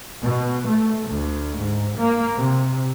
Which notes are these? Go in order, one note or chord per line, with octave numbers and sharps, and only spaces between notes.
B2
A3
D2
G#2
A#3
C3